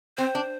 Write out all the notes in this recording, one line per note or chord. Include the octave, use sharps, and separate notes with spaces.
C4 C5
D4